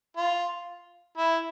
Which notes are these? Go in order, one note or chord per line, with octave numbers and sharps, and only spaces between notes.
F4
E4